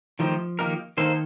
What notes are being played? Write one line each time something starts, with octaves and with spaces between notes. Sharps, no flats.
D#3 F3 A3 D#4 G4 C5
D#3 A#3 D#4 G4 A#4
D#3 A#3 D#4 A4 C5